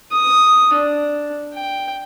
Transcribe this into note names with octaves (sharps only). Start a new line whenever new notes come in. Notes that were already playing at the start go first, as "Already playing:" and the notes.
D#6
D4
G5